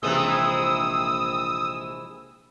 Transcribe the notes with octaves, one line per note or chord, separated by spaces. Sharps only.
A#1 C3 E3 G#3 D#6 E6